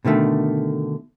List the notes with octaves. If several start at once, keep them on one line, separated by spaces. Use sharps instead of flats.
B2 D3 D#3 A3